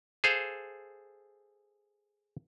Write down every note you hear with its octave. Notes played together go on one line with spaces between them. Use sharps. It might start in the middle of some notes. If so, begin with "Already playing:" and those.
G#4 A4 C5 F5